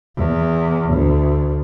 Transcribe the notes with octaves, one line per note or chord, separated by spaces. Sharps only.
E2
D2